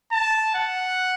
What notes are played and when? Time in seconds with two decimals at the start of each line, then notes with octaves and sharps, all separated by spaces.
0.12 A5
0.55 F#5